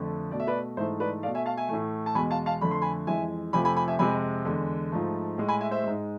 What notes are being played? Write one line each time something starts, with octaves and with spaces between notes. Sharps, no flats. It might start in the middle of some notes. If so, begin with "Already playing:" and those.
Already playing: F2 D3 A3
B2 A3 D5
E5
B4 D5
G#2 E3 A3 C5 E5
B4 D5
B2 A3 D5 F5
E5 G#5
F5 A5
E5 G#5
A2 E3 A3
A5
E2 B2 G#3 G#5 B5
F5 A5
F5 A5
F2 D3 A3 B5
C6
G#5 B5
F2 E3 G#3 E5 G#5
F2 C3 F3 A3 G#5 B5
G#5 B5
G#5 B5
E5 G#5
F2 C3 G#3 G#5 B5
E2 D3 G#3
G#2 F3 A3
A2 G#3
G#5 B5
E5 G#5
C5 E5
G#2 G#3